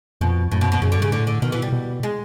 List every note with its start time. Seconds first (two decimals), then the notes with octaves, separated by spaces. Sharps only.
0.21 F2 B2
0.52 F#2 A2
0.61 B2
0.72 B2
0.82 F#2 C#3
0.92 D3
0.97 G2 C#3
1.12 A2 D3
1.27 D3
1.42 B2 D#3
1.52 E3
1.62 G3
1.72 B2
2.03 G#3